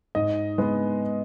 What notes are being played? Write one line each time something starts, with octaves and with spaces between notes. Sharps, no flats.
G#2 D#5
G#3 B3